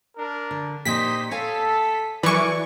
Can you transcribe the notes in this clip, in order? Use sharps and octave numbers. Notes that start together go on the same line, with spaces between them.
D4 A#4
D3
A#2 A#3 D#4 G4 C5 D#5 B6
A4 C#5 F5 G#5
E3 F#3 A#4 D5 G#5 C#6 D6